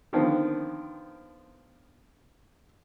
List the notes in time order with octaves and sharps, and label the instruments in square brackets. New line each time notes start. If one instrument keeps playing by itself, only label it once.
[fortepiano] D3 D#3 F3 B3 C4